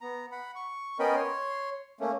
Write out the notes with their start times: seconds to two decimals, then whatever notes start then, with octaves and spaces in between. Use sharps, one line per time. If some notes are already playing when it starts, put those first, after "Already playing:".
0.01 B3 A#5
0.32 F#5 B5
0.56 C#6
0.99 B3 C#4 A#4 D#5 G5 B5
1.16 C#5 C6
2.00 A3 A#3 C#4